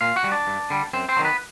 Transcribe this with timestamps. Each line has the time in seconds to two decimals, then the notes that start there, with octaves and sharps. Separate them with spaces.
0.01 A#2 F4 F5
0.16 F#4 F#5
0.24 G3
0.32 D4 D5
0.47 G2
0.70 D3 G3
0.93 F#2 C4 C5
1.09 C4 C5
1.17 D#3 F#3
1.24 B3 B4